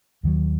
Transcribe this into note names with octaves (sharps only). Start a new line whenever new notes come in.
D#2 D#3 F#3